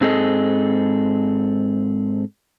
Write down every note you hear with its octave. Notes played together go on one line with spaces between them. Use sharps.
G#2 C4 G#4 A4 D#5